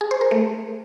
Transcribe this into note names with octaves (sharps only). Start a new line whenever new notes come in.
G#4
C5
A#4
A3